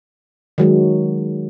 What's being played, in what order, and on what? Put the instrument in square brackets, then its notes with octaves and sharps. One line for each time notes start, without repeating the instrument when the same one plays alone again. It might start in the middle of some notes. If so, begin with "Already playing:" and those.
[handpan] D#3 F#3 G#3